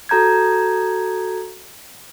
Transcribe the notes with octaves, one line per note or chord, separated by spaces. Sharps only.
F#4 A4 A#5 G6 G#6